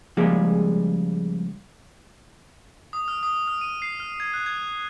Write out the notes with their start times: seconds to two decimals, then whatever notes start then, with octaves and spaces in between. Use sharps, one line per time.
0.17 C#2 F3 G3 G#3 A#3 G#4
2.93 D#6
3.08 F6
3.23 D#6
3.47 F6
3.61 D#7
3.82 C7
4.00 F6
4.20 G#6
4.34 F#6
4.46 G#6